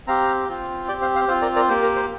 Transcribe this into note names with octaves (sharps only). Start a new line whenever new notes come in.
C4 G4 F5 A#5
C4 F4
C4 G4 D5 G5
C5 F5
C5 F5
C4 F4 C5 F5
A#4 D5
A#4 D5
A#3 G4 C5
A#4
C5